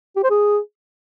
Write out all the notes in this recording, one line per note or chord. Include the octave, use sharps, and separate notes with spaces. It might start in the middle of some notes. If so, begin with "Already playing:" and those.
G4
C5
G#4